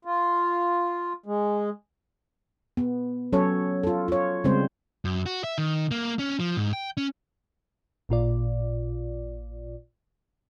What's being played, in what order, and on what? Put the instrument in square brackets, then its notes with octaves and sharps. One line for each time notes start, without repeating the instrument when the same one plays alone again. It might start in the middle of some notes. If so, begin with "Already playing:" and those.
[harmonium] F4
G#3
[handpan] B3
F#3 C#4 A4 C#5
F4 A4
F4 C#5
C#3 G3 G#3 C4 C5
[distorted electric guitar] F#2
F#4
E5
D#3
A#3
C#4
F3
G#2
G5
C#4
[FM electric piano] A1 A#2 F4 D5